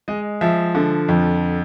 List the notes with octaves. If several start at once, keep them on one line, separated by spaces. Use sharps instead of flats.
G#3 D#5
F3 E5
D3
F2